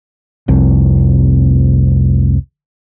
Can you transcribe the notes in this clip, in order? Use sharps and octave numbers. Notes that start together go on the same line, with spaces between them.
F1 C2